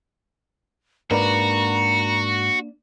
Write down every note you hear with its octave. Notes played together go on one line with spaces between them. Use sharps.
G#2 A#3 D4 F#4 B4 A#5